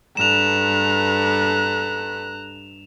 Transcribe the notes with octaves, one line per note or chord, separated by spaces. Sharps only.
G2 A4 B4 A#5 F#6 E7 F7